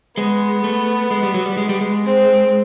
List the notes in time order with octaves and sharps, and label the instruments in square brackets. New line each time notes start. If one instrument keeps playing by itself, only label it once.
[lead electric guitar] G#3 [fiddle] B3
[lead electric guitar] A3
G#3
G3
F#3
G3
G#3
G3
G#3
[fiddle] C4